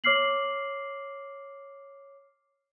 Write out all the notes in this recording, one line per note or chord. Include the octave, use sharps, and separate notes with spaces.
C#5 D6 F6 C7 F#7